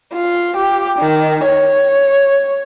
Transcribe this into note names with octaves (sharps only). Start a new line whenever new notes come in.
F4
G4
D#3
C#5